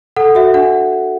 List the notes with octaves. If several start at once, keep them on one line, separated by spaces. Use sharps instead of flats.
A4 F#5
F#4 E5
D4 F#5